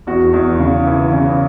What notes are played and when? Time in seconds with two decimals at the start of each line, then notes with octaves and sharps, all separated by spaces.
0.07 E2 F#4
0.33 E2
0.59 C#3
0.87 E3
1.12 C#3